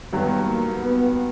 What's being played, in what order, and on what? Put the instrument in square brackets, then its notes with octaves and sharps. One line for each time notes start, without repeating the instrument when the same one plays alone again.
[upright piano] G2 D#3 F#3 [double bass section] B3
[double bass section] A#3
B3